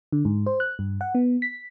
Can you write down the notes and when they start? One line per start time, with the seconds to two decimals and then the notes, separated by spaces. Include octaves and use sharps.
0.12 D3
0.25 G#2
0.46 C5
0.60 F#6
0.79 G2
1.01 F#5
1.15 B3
1.42 B6